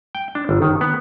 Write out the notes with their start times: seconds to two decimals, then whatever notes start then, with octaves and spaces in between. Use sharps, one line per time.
0.15 G5
0.35 D4
0.49 G1
0.62 D#3
0.81 B3